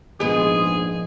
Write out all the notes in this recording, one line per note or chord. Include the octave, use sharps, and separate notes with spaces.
A#1 G#2 F3 G#3 B3 G#4